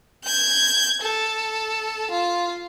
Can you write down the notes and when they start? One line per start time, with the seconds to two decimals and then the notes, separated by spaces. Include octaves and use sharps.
0.24 G6 G#6
1.02 A4
2.11 F4